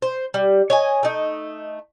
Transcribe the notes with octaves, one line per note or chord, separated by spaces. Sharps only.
C5
G3
C#5 D#5 G#5
A3 D#4